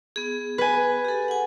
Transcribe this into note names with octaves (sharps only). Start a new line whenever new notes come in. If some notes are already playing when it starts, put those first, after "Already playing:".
B3 G#4
B4 G#5
G4 A4
F#5 G#5